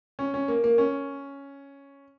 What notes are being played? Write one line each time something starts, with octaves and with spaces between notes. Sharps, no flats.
C#4
C#4
A#3
A#3
C#4